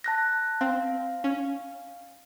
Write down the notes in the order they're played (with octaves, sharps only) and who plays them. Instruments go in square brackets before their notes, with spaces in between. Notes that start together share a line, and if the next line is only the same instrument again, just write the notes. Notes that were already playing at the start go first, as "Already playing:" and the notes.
[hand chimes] A5 F#6 A#6
[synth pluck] C4 [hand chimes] F5
[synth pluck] C#4